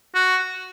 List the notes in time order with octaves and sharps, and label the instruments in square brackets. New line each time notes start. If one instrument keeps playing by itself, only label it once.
[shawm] F#4